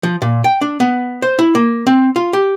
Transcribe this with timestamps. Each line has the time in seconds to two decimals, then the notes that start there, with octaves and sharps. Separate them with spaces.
0.03 F3
0.22 A#2
0.44 G5
0.61 D4
0.80 B3
1.22 C5
1.39 E4
1.55 A#3
1.87 C4
2.16 F4
2.33 G4